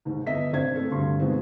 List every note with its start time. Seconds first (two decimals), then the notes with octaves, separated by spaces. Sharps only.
0.05 D#2 G#2
0.27 G1 B3 D#5 E5 B6
0.53 G#1 D4 C5 G#6
0.76 A3 B3 C4 A4
0.90 D2 G2 C6
1.19 B2 D#3 G#3 B3 C4 F4